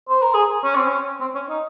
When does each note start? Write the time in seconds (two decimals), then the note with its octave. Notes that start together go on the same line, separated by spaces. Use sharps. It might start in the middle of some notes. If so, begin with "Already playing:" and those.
0.09 C5
0.22 A#4
0.34 G#4
0.63 C#4
0.75 C4
0.87 C#4
1.20 C4
1.35 C#4
1.49 D#4